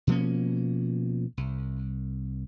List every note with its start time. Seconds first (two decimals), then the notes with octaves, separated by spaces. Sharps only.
0.07 B2 F3 A#3 C#4
1.37 C2